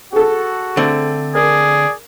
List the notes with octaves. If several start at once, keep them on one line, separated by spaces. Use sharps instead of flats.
F#4 G#4 A4
D3 A3 C4
G#4 A#4 D5